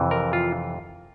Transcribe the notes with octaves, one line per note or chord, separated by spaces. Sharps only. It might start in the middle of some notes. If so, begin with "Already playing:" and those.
Already playing: F2 C3 E3
A#4
F4